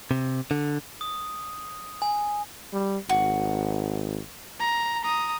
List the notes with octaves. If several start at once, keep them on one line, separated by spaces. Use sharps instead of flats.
C3
D3
D#6
G#5
G3
G#1 F#4
A#5
A#5 D#6